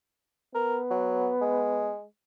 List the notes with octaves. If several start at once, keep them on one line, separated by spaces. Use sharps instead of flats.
B3 A#4
F#3
G#3